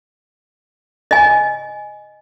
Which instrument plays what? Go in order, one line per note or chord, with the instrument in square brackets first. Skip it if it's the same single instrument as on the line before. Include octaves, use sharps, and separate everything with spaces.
[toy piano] D#5 G#5